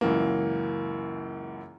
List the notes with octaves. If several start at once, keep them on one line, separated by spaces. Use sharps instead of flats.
C#2 F#2 E3 A#3